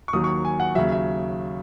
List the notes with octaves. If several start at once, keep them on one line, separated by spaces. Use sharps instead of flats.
C#6
D#2 D#3 F#3 D#6
C#6
G#5
F#5
D#2 C#3 F#3 E5
E5